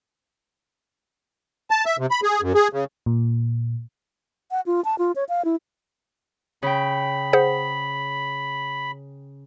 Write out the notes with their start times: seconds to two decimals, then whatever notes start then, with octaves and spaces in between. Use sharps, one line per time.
1.70 A5
1.86 E5
1.99 C3
2.11 B5
2.23 G#4
2.42 F#2
2.55 G#4
2.73 C#3
3.06 A#2
4.51 F#5
4.66 F4
4.85 A5
4.99 F4
5.16 C#5
5.29 F5
5.45 E4
6.63 C#3 G5 B5
7.33 G#4 C5 F#5